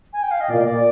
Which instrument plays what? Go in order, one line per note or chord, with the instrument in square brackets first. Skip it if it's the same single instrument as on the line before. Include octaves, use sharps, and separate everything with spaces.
[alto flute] G#5
G5
F5
D#5
[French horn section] A#2 [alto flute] D5
[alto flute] D5